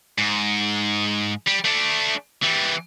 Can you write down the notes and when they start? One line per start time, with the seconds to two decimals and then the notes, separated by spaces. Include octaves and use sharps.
0.18 G#2
1.47 G3
1.65 A3 D4
2.43 E3 G3